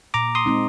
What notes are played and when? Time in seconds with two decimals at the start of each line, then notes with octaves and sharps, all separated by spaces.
0.14 A#2 A#5 D6
0.35 C6 D#6
0.46 G#3 C4 D#4